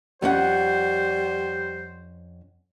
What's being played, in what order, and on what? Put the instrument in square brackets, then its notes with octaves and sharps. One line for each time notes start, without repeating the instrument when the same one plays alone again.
[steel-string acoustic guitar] F2 C#4 F#5 [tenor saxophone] G3 [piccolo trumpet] C5